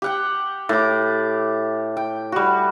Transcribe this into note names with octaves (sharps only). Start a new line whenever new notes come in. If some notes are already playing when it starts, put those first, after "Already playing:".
G4 F#5 G5
A2 D6
G5
G3 F#4